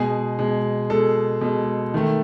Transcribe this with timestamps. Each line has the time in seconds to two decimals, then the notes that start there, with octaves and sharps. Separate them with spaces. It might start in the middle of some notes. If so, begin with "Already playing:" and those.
Already playing: B2 G#3 G#4
0.39 B2 G#3
0.90 B2 G#3 A4
1.41 B2 G#3
1.94 D#3 A3